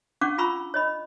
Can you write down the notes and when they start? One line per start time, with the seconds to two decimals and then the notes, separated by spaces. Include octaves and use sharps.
0.21 C#4 D4 F5 F#5 C#6 D6
0.38 F4 G#5 A#5 B5 C#6 E6
0.74 C#5 D#5 B5